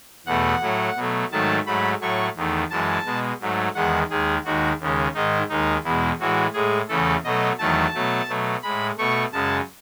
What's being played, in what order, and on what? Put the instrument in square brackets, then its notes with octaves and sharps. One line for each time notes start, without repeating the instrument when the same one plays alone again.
[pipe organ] E2 B2 A3 F#5
A2 F#3 A3
B2 F#3 A3
G#2 D#3 F#3 A3 A5
G#2 F#3 A3 B5
A2 F#3 A3 C#6
E2 D#3 A3
F#2 E3 G#3 A5
B2 G#3
G#2 F#3 A3
E2 D#3 G#3 F#5
D#2 D#3 G#3 G#4
D#2 D#3 G#3 F#4
D#2 C#3 G#3
G#2 D#3 G#3 D#4
D#2 D#3 G#3 D#4
E2 B2 G#3 E4
A2 E3 G#3 F#4
A2 G#3 G#4
E2 C#3 E3 A3 A4
B2 F#3 A3 D#5
E2 D#3 F#3 A3 A5
B2 F#3 A3
B2 F#3 A3
A2 G#3 B5
B2 A3 C#6
F#2 C#3 G#3 A5